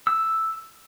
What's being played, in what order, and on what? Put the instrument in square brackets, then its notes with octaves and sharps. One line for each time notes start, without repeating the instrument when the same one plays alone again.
[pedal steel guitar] E6